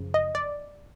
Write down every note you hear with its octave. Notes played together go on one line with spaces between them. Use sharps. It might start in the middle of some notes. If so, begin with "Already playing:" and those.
Already playing: F#2 C#3 F3
D#5
D5